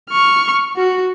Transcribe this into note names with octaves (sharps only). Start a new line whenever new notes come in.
C#6 F6
F#4